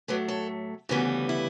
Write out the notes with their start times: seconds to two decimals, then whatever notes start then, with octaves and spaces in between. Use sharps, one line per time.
0.08 A2 F#3 A3 B4 D5
0.28 A4 C#5
0.89 D2 C#3 E3 G3 B3 F#4
1.29 E4